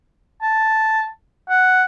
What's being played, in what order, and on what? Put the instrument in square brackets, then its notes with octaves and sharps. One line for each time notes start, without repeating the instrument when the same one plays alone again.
[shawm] A5
F#5